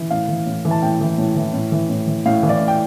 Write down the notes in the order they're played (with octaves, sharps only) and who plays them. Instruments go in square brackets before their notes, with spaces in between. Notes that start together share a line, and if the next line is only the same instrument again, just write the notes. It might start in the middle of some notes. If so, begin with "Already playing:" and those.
Already playing: [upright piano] E3
A2 F5
E3
A2
E3
A5
A2 G5
E3
A2
E3
A2
E3
A2
E3
A2 F5
E3
D5
A2
G5